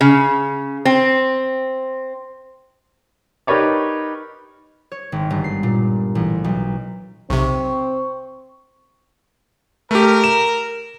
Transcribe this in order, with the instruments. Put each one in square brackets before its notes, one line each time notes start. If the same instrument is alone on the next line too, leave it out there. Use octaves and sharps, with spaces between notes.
[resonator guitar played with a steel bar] C#3
C4
[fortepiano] D#4 G4 A#4 B4 C#5 D5
[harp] C#5
G#1
G1
C7
A#2
A1
B1
[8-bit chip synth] B1 C3 [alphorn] C4 [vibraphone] C#6
[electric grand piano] A3 G4 [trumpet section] A#4
[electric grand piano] E7